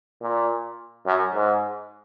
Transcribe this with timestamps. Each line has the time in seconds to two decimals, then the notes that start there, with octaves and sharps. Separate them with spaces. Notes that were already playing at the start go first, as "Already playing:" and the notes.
0.22 A#2
1.07 F#2
1.35 G#2